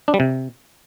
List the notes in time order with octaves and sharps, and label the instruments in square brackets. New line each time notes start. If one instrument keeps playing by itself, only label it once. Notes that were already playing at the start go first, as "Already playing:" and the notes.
[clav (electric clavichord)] D4
G3
C3